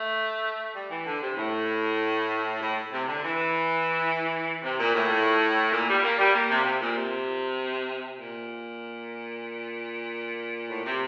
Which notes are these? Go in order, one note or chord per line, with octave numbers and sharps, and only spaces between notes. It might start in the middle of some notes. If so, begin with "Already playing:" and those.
Already playing: A3
G3
E3
D3
C3
A2
A2
C3
D3
E3
C3
A#2
A2
A#2
G3
A#3
G3
A#3
C3
C3
A#2
C3
A#2
A2
C3